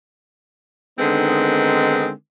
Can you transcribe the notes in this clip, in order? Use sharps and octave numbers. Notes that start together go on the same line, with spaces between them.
D3 D#3 G#3 B3 C4 D#4